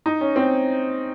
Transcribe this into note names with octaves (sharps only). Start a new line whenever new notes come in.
D#4
C#4
C4